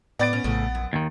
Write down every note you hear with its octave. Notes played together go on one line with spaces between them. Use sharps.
A2 B3 D5 A6 D7
C#4
A#1 A2 C#3
F#2
D#2 D#3